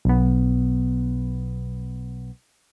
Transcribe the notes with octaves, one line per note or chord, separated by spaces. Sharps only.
B1 B3